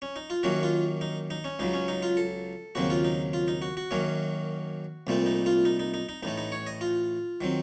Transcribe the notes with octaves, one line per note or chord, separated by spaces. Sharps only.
C#4
D#4
F4
F#2 D#3 A#3 C#4 F#4
F4
D#4
D#4
C#4
C#2 C#3 F#3 D#4
C#4
D#4
F4
A4
D#2 C#3 F#3 C4 F#4
F4
D#4
F4
D#4
F#4
F#4
F#2 D#3 A#3 C#4
C2 A#2 A3 C4
D#4
F4
D#4
D#4
D#4
D#4
A1 A2 A3 D#4
D#4
C#5
D#5
F4
D#3 F#3 C4